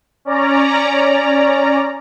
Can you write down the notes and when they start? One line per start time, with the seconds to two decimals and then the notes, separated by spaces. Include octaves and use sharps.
0.25 C#4 D5 A#5